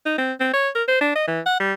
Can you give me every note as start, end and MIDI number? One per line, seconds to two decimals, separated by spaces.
0.06 0.17 63
0.18 0.32 60
0.40 0.52 60
0.53 0.69 73
0.75 0.83 70
0.88 1.00 72
1.01 1.11 62
1.15 1.25 75
1.27 1.40 52
1.46 1.56 78
1.60 1.73 55